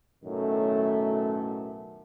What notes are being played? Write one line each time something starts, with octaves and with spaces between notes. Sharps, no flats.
B1 F#2 A2 D#3 F#3 A3